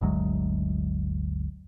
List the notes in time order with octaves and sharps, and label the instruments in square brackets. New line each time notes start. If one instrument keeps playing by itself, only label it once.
[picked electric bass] G1 D2 F#3 G#3